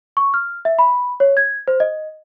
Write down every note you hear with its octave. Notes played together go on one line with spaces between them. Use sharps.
C#6
F6
E5
B5
C#5
G#6
C5
D#5